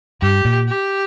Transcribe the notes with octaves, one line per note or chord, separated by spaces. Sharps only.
G2 G4
A#2
G4